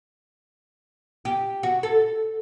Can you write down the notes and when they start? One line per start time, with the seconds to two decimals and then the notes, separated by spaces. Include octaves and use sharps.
1.25 G4
1.63 F#4
1.83 A4